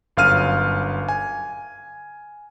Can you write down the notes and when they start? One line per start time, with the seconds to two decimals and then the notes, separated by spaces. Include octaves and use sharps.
0.17 G1 F#2 F5 F6 D#7
1.09 G#5